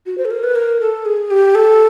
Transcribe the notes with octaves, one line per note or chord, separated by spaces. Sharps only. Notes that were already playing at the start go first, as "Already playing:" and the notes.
F#4
C5
A4
A#4
B4
A#4
A4
G#4
G4
A4